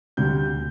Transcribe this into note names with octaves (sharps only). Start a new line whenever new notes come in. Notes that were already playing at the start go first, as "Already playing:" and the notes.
D2 C3 G3 G6